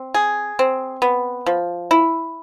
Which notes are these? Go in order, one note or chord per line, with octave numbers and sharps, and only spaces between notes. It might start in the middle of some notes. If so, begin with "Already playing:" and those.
Already playing: C4
G#4
C4
B3
F3
E4